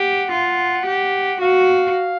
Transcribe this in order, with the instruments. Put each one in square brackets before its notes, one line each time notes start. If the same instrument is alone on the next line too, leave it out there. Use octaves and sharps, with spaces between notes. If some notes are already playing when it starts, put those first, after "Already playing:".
Already playing: [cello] G4 [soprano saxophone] F#5
[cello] F4
G4
[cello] F#4 [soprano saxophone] F5